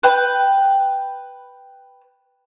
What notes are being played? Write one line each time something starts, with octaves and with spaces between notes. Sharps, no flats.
B4 G5